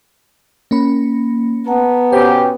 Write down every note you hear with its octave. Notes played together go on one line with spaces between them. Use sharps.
A#3 C#4 B5
B3 F#5 A5 A#5
B2 C#4 G4 C5